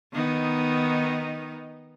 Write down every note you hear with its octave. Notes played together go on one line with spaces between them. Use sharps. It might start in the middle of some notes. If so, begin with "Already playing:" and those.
D#3 B3 D#4